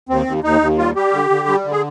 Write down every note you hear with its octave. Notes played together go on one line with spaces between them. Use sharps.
D#2 C4
D#2
D#2 D#4
D#2
G3 F4
G3 G4
D3
D3
G3
D3
G#4